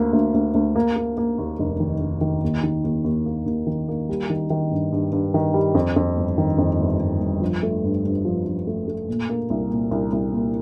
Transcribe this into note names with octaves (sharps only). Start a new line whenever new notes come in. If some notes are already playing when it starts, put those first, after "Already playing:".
Already playing: D2 A#3
D2
D2
D2
A#3
A#3
A#3
D#2
F1
D#3
F1
D#3
D#2
D#3
D#2
D#2
A#3
D#2
D#3
A#3
G3
D#3
D#3
G2
G2
G2
D#3
G3
F2
F2
G1
D#3
F2
G1
G1
G1
F3
A3
G2
G2
F3
F3
A3
A3
A#2
A#3
C2
A#2
C2
C2
A#2